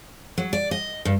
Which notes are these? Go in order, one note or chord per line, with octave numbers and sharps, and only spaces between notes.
F#3
D5
D#5
G2